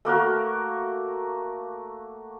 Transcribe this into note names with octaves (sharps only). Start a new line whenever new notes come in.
A3 A#3 F#4 A#4